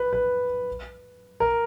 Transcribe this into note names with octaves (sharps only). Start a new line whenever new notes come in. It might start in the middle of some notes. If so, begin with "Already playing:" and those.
Already playing: B4
B4
A#4